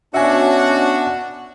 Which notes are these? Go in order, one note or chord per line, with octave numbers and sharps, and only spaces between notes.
B2 C#4 D4 F#4 E5 G#5